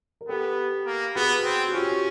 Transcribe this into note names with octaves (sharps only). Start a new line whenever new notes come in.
A#4
B3 G4 A4
A#3
B3 F#4 G#4
C4
F#4
C#4 F4 G4